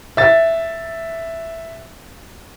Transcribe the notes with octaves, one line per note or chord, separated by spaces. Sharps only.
E5 A6